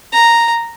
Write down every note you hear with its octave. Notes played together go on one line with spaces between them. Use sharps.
A#5